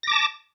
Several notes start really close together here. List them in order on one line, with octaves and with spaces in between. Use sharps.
A#6 D6 A5